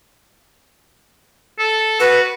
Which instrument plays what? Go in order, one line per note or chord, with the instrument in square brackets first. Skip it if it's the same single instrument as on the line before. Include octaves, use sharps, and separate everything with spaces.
[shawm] A4
[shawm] F#4 [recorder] B4